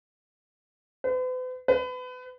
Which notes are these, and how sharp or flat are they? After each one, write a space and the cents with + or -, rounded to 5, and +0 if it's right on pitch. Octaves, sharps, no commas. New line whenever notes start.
B4 +45
B4 +30